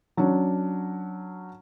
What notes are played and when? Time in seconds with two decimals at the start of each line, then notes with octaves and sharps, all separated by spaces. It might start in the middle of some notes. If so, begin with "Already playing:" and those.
0.17 F#3 C#4 D4